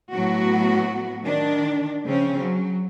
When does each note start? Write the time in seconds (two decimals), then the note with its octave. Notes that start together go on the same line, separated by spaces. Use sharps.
0.11 A2 F#3 B3 F#4
1.25 D#3 D4
2.06 C#3 F3 C4 C#4
2.39 F#3